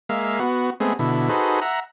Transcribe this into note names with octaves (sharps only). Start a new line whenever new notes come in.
G#3 A#3 E5 F5
B3 F#4
G#3 A3 B3 C4 G#4
B2 D3 E4
D#4 F#4 G#4 A4 B4 C5
E5 F#5 A#5